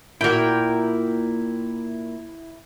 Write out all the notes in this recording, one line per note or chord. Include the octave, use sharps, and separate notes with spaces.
A#2 E4 F#4 A#4 G5